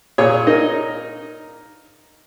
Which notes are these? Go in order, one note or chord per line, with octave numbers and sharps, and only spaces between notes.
A#2 G#4 C#5
D#4 A#4 D#5